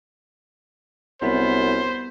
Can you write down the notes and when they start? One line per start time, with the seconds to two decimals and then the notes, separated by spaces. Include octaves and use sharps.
1.22 C2 F#2 B3 C5